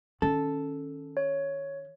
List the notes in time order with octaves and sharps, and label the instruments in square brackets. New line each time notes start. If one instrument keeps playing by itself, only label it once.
[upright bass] D#3 C#4 [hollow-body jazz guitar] A4
[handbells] C#5